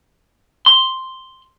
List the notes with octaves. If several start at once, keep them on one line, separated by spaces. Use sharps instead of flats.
C6